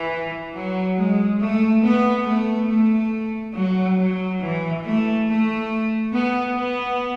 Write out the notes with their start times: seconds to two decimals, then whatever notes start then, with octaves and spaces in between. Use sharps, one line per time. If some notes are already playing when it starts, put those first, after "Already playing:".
Already playing: E3
0.54 F#3
0.97 G#3
1.40 A3
1.83 B3
2.26 A3
2.68 A3
3.55 F#3
3.98 F#3
4.41 E3
4.84 A3
5.27 A3
6.13 B3
6.56 B3